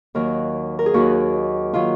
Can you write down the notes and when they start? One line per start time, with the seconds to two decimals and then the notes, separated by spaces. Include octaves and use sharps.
0.15 D#2 D#3 F#3 A#4
0.79 A#4
0.86 G#4
0.94 D#2 D#3 F#3 F#4
1.74 D#3 F#3 F4